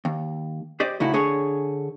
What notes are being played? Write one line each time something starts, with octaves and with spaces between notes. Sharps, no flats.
D#2
G4 C5 D5 D#5
A2 C#3 A3 D#4 E4 F#4
D3 G#4 C#5